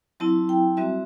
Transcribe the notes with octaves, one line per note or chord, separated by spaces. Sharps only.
F#3 C4 E4 A5
G5
G3 C4 F#4 E5